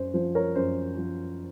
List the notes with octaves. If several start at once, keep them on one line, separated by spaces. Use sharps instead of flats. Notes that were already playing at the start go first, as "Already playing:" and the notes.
Already playing: F#2 C5
F3 C5
A#4 C#5
F#2 C5
F3